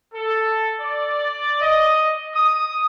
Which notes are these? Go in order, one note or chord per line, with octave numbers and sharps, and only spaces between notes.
A4
D5
D#5
D#6